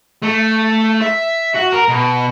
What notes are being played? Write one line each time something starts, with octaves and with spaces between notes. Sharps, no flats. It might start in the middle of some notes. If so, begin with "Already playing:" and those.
A3
E5
F#4
A#4
B2